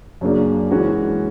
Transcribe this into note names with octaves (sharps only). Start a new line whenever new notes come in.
F#2 C#3 F#3 A#3 D4
E3 G#3 C#4 F#4